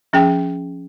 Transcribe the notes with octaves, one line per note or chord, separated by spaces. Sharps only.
F3 C#4 G#4 G5